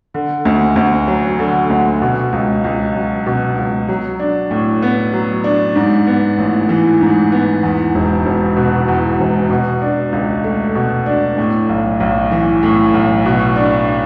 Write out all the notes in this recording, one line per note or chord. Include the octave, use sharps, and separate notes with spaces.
D3
D2
D2
F#3
D3
D2
B2
C#2
C#2
F#3
B2
C#2
F#3
D4
A2
B3
F#3
D4
G#2
B3
A1
E3
G#2
B3
E2
E1
E1
B2
E2
E1
B2
D4
C#2
A3
B2
D4
A2
B1
B1
E3
A2
B1
B2
D4